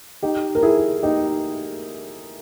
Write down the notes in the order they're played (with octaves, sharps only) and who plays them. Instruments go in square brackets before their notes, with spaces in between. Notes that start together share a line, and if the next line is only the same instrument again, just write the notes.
[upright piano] D#4 G4
A#4
E4 G#4
D#4 G4